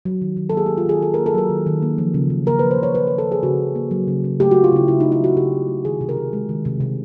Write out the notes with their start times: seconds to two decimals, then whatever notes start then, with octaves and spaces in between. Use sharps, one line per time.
0.05 F#3
0.21 D#3
0.37 D#3
0.50 A4
0.54 A#3 G#4
0.66 G4
0.70 F#3
0.78 F4
0.85 D#3 G#4
1.01 D#3 A4
1.14 A#4
1.18 A#3
1.26 A4
1.34 F#3 A#4
1.49 D#3
1.66 D#3
1.82 A#3
1.98 F3
2.14 C#3
2.30 C#3
2.46 A#3 A#4
2.59 B4
2.63 F3
2.71 C5
2.79 C#3 C#5
2.95 C#3 B4
3.07 A#4
3.11 A#3
3.18 A4
3.27 F3 G#4
3.43 C#3 F#4
3.60 C#3
3.75 A#3
3.91 F#3
4.08 C#3
4.24 C#3
4.40 A3 G4
4.51 F#4
4.56 F#3
4.64 F4
4.72 C#3 E4
4.88 C#3 E4
5.00 D#4
5.03 A3
5.12 E4
5.20 F#3 F#4
5.36 C#3 G4
5.52 C#3
5.68 A3
5.85 D#3 G#4
6.01 C3
6.09 A#4
6.17 C3
6.33 G#3
6.49 D#3
6.65 C3
6.80 C3